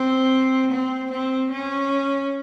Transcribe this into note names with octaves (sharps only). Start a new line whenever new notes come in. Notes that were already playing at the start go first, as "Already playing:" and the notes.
Already playing: C4
C4
C4
C#4